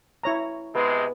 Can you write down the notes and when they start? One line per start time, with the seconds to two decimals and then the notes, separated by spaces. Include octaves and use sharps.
0.23 E4 C#5 A#5
0.75 C3 G#3 B3